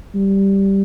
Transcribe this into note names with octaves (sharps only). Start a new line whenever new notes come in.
G3